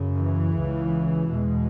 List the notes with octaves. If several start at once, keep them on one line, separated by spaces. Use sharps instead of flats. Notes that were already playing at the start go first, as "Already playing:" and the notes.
Already playing: F#2 C#3
E3
C#2 C#3
E2 B2 G#3